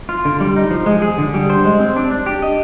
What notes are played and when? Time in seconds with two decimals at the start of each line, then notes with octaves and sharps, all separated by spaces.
0.09 F4
0.25 D3
0.40 G3
0.56 D#4
0.71 F3
0.86 G#3
1.02 G#4
1.18 D3
1.34 G3
1.50 C5
1.65 G#3
1.80 C4
1.96 D4
2.11 D4
2.26 G4
2.42 D#5